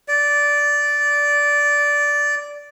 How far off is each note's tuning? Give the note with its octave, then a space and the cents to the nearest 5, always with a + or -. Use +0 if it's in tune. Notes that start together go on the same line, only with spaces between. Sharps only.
D5 -10